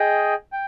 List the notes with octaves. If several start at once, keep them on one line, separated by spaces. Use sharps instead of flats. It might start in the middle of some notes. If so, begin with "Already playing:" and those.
Already playing: G#4 D#5 G5
G5